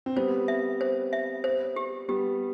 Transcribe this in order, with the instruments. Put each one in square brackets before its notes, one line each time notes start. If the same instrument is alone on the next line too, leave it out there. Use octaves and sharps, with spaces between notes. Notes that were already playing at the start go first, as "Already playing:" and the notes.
[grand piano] C4
[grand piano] G3 B3 [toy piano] C5
[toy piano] E5
C5
E5
C5
G4
[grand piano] G3 B3 [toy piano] G4